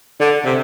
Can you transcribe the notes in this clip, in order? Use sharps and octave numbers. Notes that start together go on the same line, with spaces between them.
D3
C3